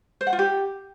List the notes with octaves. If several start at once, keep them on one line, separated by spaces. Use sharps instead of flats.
C5
F#5
F4
G4